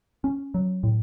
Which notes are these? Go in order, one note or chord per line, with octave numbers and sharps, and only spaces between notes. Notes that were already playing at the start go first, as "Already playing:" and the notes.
C#4
F#3
A2